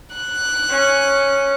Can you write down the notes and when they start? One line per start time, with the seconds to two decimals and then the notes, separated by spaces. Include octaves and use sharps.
0.16 F#6
0.69 C#4